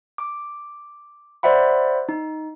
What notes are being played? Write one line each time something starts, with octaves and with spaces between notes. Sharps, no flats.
D6
C5 D5 E5 F#5 B5
D#4